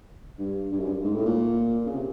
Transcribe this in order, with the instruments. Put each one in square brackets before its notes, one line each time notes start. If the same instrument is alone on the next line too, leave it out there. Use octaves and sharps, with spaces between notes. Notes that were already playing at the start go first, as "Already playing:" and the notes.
[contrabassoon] G2
G2
F#2
G2
G#2
A2
A#2
C#3
C3